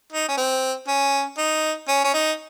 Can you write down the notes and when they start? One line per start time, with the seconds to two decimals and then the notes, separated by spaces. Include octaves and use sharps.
0.12 D#4
0.28 C#4
0.37 C4
0.88 C#4
1.38 D#4
1.88 C#4
2.04 C#4
2.14 D#4